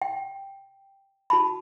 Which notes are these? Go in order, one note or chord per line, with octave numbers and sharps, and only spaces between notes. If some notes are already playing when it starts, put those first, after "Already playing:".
G5
F#4 A5 B5